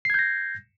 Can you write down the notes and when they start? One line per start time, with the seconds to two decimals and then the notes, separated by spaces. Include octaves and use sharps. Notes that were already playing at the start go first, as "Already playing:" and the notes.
0.05 C7
0.10 G#6
0.14 G6
0.19 A#6